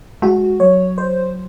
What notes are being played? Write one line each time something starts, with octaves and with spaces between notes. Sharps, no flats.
G#3 F#4
F#3 C#5
C5